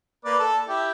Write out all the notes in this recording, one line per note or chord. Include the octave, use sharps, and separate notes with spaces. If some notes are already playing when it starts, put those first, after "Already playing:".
A#3 B4 D5
A4
E4 G4